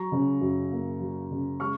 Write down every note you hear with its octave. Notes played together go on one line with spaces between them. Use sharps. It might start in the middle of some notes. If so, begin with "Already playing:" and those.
Already playing: F#3 A#5 C#6
C#3
F#2
A#3
F#3
C#3
G#3 C#6 F6